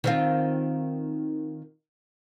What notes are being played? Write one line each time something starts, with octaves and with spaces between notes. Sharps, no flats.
D#3 C4 F4